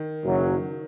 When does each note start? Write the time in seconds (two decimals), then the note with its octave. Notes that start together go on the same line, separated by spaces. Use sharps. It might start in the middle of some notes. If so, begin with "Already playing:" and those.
Already playing: D#3 D#4
0.24 F#1 F#2 F#3